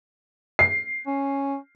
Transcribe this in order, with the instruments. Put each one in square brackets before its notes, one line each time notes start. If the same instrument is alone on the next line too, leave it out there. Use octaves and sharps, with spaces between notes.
[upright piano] C7
[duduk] C#4